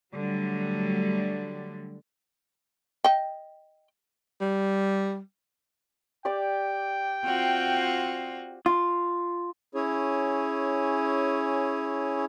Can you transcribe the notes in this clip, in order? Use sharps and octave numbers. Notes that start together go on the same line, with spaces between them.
D3 F#3 G3 A3
D#5 G5
G3
G4 D5 G5 D6
C4 F4 F#4
F4
C#4 E4 G#4 C#5